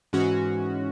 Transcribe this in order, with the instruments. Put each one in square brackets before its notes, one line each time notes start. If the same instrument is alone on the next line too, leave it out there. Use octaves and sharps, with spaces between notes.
[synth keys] G#2 E3 G#3 C#4 F#4